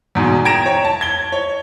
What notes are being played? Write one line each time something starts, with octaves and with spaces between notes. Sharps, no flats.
E2 G#2 B2
G5 A#5 G#6 A#6 D7 E7
C#5
A5
G#6 G7
C#5